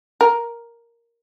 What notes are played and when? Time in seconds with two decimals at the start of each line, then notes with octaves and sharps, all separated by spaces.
0.21 A#4